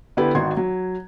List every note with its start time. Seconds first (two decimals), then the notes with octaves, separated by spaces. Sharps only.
0.17 D3 B3 E4 G4 B4
0.35 G#1 D#3 F#4 C6 G#6
0.57 F#3